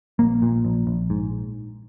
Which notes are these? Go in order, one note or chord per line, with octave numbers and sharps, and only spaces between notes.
A#1 A#3
A#2
A#1
A#1
G#2